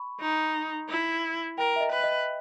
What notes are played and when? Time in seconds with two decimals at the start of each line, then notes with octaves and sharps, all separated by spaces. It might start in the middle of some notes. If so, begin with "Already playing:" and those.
Already playing: B5 C#6
0.21 D#4
0.89 E4
1.58 A#4 G5
1.76 E5
1.81 D#5
1.92 B4
2.04 D#5